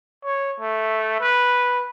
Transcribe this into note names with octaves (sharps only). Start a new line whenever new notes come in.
C#5
A3
B4